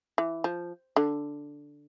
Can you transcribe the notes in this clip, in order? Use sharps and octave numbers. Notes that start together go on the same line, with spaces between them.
E3
F3
D3